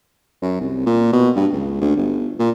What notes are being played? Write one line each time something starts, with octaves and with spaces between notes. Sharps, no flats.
F#2
C2
A#2
B2
G2
C#2
D2
G1
A#2